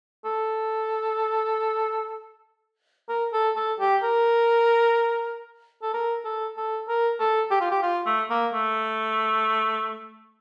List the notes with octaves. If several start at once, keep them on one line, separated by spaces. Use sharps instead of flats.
A4
A#4
A4
A4
G4
A#4
A4
A#4
A4
A4
A#4
A4
G4
F4
G4
F4
A3
A#3
A3